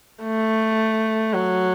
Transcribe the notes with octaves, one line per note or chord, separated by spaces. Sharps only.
A3
F#3